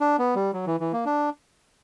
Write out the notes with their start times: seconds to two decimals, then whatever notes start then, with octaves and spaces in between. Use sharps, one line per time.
0.01 D4
0.19 B3
0.35 G3
0.53 F#3
0.67 E3
0.80 E3
0.93 A#3
1.06 D4